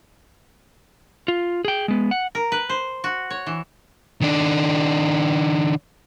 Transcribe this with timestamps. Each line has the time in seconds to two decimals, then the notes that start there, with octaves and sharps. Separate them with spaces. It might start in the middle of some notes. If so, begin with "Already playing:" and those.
1.28 F4
1.65 G#4 G5
1.88 G#3 B3
2.11 F#5
2.35 A#4
2.52 B4
2.69 C5
3.04 F#4
3.30 C#5
3.47 E3
4.22 D#3 D4